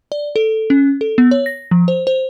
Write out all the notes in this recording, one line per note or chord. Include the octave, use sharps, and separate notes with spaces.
D5
A4
C#4
A4
B3
C#5
A#6
F3
C5
C5